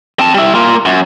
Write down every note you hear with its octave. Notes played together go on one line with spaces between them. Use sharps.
C4 A5
G3 E4
A#3 F4
F#2